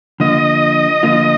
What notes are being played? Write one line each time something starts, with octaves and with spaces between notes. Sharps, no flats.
D3 F3 A#3 F4 D#5
D3 F3 A#3 F4